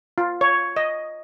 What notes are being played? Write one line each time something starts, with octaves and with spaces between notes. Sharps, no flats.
F4
C#5
D#5